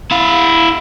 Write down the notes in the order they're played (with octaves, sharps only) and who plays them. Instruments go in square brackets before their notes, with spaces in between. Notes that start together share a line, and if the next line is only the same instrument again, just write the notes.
[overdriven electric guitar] E4 F5